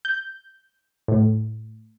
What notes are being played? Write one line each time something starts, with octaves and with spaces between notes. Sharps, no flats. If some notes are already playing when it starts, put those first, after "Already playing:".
G6
A2